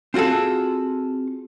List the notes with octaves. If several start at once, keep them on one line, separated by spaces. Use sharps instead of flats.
C4 F4 F#4 G#4 A4